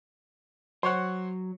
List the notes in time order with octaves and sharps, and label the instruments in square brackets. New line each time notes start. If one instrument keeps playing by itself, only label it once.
[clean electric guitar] F#3 [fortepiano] C5 C#5 F#5